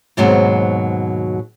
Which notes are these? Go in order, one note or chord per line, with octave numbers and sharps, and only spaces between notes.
D#2 G#2 B2 F#3 C4